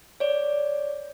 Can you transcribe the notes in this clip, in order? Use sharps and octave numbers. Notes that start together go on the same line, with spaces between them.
C#5 D5